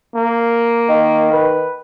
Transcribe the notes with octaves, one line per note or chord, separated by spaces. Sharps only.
A#3
D#3
B4